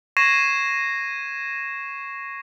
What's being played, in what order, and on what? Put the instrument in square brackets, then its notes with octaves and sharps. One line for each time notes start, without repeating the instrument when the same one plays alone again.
[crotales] C#6 G#6 A#6 C7 D#7 E7